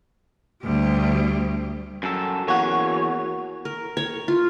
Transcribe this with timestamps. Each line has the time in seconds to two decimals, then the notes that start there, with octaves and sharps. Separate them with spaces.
0.62 D2 G3
2.03 F#2 A4
2.48 E2 A#3 F#4 C#5
3.65 A#4
3.97 C#5
4.28 F4